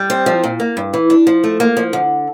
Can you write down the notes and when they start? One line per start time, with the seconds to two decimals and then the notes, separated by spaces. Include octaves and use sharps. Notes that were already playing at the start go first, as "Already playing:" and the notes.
Already playing: G3
0.10 C4
0.26 F3
0.44 A#2
0.60 A#3
0.77 G2
0.94 E3
1.10 D4
1.27 F3
1.44 A3
1.60 A#3
1.77 F3
1.93 D3